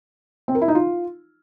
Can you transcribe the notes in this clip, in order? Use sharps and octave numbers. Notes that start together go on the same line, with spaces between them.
C4
A#4
E4
D#4
F4